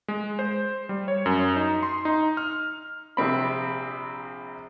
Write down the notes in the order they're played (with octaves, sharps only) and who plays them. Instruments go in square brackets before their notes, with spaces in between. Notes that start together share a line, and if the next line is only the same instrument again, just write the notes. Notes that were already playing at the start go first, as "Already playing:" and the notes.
[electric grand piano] G#3
C5
G3
C#5
F#2
D#4
C6
D#4
F6
[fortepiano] A#1 C3 C4 B5